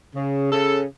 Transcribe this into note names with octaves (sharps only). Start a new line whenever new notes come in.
C#3
C#3 A4